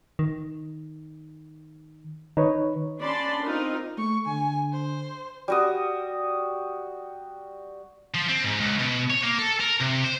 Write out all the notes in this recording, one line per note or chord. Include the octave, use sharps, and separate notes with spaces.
D#3
D#3 D#4 B4 C#5
C#4 D4 D5 A5 B5 C6
C4 D#4 F4 A#4
A3 C#6
D3 G#5
C5
G3 F#4 D#6
F3
C4
G#2
C#2
B2
C#5
A#3
A4
A#4
C3
C5